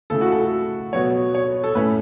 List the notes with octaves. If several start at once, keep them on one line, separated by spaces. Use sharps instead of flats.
C#3 A3 E4 A4
F#4
A4
B2 F#3 B3 F#4 C#5
C#5
A4
A2 A3 C#4 B4